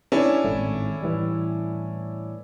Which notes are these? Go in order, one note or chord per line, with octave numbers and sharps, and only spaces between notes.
C#4 D4 E4
G#1 A2 A3
A2 E3 G3